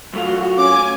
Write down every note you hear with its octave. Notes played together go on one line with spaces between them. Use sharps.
F#2 A3 F4 F#4
C#4 G#5 D6